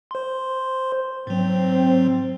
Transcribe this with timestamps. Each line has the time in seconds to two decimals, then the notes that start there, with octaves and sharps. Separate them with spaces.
0.11 C5 C6
1.27 G#2 F#3 C4